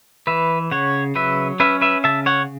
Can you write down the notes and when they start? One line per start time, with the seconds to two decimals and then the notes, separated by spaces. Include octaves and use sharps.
0.27 E3 B4 E5
0.71 C#3 C#5 F#5
1.15 F#3 B4 E5
1.60 C#4 B4 E5
1.81 B4 E5
2.04 C#3 E5 A5
2.26 C#5 F#5